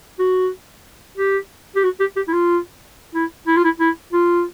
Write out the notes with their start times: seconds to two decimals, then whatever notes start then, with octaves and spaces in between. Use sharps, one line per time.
0.19 F#4
1.18 G4
1.76 G4
1.84 F#4
2.00 G4
2.16 G4
2.28 E4
2.33 F4
3.14 E4
3.47 E4
3.57 F4
3.64 E4
3.80 E4
4.13 F4